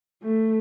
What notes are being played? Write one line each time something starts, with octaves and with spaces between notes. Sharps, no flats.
A3